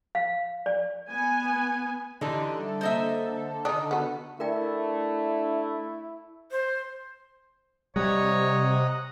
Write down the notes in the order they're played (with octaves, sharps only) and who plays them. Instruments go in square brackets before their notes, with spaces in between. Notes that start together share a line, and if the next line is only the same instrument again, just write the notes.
[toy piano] F5
D5
[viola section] B3 G#5
[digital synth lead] D3 [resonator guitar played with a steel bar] E3 D4 D#4 [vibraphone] G4 C6
[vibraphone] G3 E5
[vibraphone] A#3 A#5 [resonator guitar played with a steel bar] C5 D#5 E5
[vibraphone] A5
[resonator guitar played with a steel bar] D#3 [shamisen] D4 D#4
[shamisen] B3 F#4
[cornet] A3 [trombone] D4 [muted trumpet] E4 [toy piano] A#4 D5 G5
[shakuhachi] C5
[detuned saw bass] C3 [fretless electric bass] G3 [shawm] C#5 [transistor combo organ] D#5 F#5 A#5